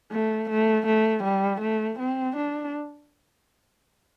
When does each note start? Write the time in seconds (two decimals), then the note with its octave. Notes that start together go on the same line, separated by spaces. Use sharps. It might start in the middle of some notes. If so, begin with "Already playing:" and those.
0.12 A3
0.50 A3
0.87 A3
1.24 G3
1.61 A3
1.99 C4
2.36 D4